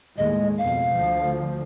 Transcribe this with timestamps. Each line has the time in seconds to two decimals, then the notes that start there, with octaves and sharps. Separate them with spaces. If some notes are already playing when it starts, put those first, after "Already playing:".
0.18 D#2 A2 G#3 D#5
0.58 F2 B2 F5
0.93 D2 F3